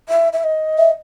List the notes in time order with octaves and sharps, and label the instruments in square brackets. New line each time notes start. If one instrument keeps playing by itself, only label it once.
[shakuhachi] E5
E5
D#5
[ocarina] E5